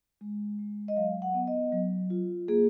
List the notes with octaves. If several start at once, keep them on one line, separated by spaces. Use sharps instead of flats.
G#3
G#3
D#5
F#3 F5
F#5
B3
D#5
F#3
F4
A#3 G#4